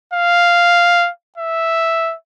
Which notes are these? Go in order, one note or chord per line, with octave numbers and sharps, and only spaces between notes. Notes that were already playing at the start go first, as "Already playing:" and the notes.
F5
E5